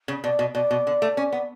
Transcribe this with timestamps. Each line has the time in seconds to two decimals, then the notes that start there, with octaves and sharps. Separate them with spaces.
0.08 C#3
0.24 B2 D5
0.39 B2
0.55 B2 D5
0.71 B2
0.87 D3
1.02 A3
1.17 C#4
1.32 B3